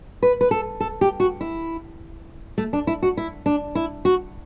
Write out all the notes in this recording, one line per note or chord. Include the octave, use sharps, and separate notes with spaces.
B4
B4
A4
A4
G4
F#4
E4
A3
D4
E4
F#4
E4
D4
E4
F#4